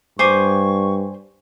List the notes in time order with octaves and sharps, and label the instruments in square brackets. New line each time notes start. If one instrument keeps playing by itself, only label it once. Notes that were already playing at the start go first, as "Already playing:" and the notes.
[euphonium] G2 [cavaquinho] C5 G#5 D6 [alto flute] C#6